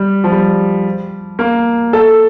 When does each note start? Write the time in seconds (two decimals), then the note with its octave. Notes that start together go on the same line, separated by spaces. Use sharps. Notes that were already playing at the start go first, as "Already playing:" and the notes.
Already playing: G3
0.24 F3
0.32 G3
1.39 A#3
1.93 A4